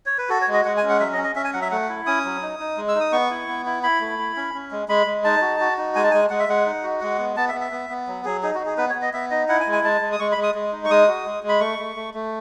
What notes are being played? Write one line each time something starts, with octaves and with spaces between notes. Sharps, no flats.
C#5
B4
F#4 A4
C#5
G#3
D#5
G#3 F#5
G#5
C#4
F#5
F#3 E5
D#5
C#4
D#5
C#4 E5
G#5
F#3 F#5
E5
A3 F#5
E4
C#4 D#6
F#3
D#4
D#4
G#3
E6
D#4
D#6
B3 C#6
E4
B3
E4
E4 B5
A3
E4
C#4
C#4
G#3
G#3 B5
G#3
D#4 A5
F#4
F#4
D#4
G#3 G#5
A5
G#3 G#5
G#3 F#5
E5
G#3 F#5
D#4
F#4
G#3 F#5
B3
B3 A5
E5
B3
E5
B3
B3
F#3
F#3 G#4
D#4 G#4
F#4
D#4
G#4
B3 B4
C#5
B3
D#5
B3 E5
D#4 D#5
E4 F#5
G#5
G#3
G#5
G#3 A5
G#3
D#6
G#3 C#6
B5
G#3
D#6
G#3
D#4
C#6
G#3 D#6
F#4
G#3
G#3
B5
A3 C#6
A3
A3
A3